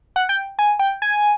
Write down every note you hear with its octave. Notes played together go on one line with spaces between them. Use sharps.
F#5
G5
G#5
G5
G#5